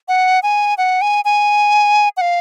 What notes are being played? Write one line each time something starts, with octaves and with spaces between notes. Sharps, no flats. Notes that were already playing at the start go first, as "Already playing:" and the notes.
F#5
G#5
F#5
G#5
G#5
F#5
F5